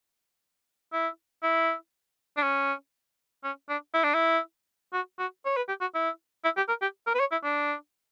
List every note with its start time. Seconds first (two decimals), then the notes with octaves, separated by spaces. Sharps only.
0.93 E4
1.43 E4
2.37 D4
2.43 C#4
3.44 C#4
3.69 D4
3.94 E4
4.04 D4
4.15 E4
4.93 F#4
5.19 F#4
5.45 C#5
5.57 B4
5.68 G4
5.81 F#4
5.94 E4
6.44 E4
6.57 G4
6.69 A#4
6.82 G4
7.07 A#4
7.15 B4
7.20 C#5
7.32 E4
7.44 D4